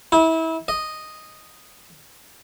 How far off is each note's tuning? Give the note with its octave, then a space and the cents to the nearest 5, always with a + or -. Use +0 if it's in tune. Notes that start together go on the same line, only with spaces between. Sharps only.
E4 -30
D#5 -5